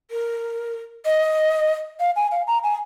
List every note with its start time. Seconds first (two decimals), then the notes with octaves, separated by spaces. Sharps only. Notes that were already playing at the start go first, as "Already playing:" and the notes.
0.11 A#4
1.06 D#5
2.00 F5
2.16 G#5
2.31 F5
2.47 A#5
2.63 G#5